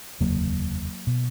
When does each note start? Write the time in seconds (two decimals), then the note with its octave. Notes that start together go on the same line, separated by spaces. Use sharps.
0.21 F1 D#2 C#3 F#3 A#3
1.07 B2